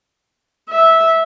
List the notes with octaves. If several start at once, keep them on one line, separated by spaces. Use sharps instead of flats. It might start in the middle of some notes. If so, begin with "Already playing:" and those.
E5